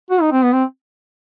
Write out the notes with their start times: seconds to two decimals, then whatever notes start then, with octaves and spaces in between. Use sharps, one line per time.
0.11 F#4
0.21 D#4
0.32 C4
0.43 B3
0.53 C4